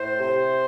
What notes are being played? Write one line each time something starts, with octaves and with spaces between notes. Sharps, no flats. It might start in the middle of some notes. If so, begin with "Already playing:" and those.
Already playing: A2 C5
C3